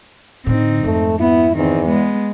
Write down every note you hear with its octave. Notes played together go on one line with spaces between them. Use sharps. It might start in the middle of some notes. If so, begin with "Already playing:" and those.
A2 D3 C4 D#4
F2 G#2 A3
B3 E4
E2 D#3 C4
G#3 B3